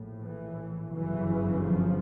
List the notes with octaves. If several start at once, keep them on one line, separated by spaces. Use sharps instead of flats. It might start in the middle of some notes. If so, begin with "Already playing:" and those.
Already playing: A#1 A2
E3
G1 F#2 C#3 E3
F3